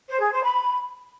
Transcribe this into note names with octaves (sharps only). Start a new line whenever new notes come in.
C5
G#4
C5
B5